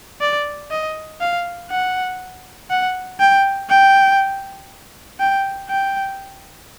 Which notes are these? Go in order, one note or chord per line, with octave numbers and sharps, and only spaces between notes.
D5
D#5
F5
F#5
F#5
G5
G5
G5
G5